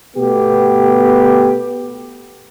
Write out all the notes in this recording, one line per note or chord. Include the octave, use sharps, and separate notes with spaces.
B2 A3 B3 G4